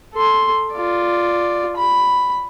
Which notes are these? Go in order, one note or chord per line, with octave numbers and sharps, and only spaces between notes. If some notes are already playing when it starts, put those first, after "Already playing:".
A4 C6
F4 D5
B5